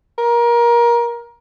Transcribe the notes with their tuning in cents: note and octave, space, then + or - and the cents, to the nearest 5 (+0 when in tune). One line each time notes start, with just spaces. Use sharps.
A#4 +25